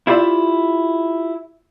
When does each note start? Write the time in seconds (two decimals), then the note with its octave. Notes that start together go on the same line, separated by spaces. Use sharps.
0.07 E4 F4 G4 D5 E5